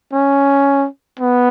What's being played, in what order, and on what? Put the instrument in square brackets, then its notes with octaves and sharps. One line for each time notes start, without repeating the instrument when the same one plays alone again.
[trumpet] C#4
B3